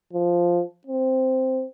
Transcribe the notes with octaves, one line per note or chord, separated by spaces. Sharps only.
F3
C4